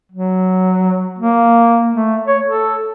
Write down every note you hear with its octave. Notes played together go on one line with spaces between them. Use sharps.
F#3
A#3
A3
C#5
A4